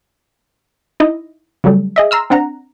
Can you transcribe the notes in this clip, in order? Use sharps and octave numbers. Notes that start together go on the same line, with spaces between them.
D#4 E4 D#5
C#3 F#3 G3 A3
G#4 D#5 E5
A#5 C6 E6 F6
C4 D4 F#5 A#5